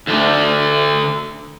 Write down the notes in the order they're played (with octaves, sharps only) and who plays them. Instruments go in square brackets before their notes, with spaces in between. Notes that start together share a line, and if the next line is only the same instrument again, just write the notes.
[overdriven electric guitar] D2 D3